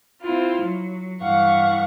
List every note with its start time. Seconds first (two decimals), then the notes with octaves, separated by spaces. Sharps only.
0.21 C4 E4 F4
0.59 F#3
1.20 G2 E3 F5 F#5 C#6